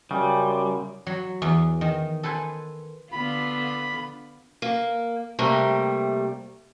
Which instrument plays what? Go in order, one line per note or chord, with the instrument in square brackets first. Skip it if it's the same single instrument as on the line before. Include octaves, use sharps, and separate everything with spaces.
[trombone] F#2 [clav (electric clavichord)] C#3 [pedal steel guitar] G3
[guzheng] F#3
E2
D#3
A4 B4 C5 G#5
[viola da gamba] D3 B3 F4 [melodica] B5
[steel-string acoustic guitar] A#3
C3 G3 A3 A#3